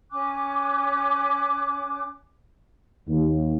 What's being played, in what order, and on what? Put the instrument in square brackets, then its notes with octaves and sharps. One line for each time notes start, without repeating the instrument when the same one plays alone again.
[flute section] C#4 G#5 D6 F#6
[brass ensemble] D#2